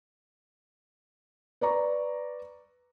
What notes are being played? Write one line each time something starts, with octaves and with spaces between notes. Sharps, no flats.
B4 D5 A#5 C#6